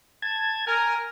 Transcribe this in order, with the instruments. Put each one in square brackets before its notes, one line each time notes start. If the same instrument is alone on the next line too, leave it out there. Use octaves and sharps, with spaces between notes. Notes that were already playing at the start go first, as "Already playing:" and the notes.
[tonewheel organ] A5 G#6
[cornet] A#4 [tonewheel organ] G#5 F6